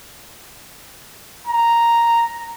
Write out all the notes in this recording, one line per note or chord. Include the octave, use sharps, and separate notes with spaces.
A#5